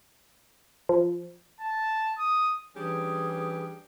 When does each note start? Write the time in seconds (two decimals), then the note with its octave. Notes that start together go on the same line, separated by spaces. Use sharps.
0.89 F3
1.60 A5
2.18 D#6
2.76 E3 G3 C#4 D4 G#4